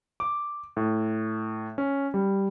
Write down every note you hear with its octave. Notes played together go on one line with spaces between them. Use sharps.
D6
A2
C#4
G3